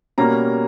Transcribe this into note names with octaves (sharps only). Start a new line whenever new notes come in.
B2 G3 A#3 C#4 A#5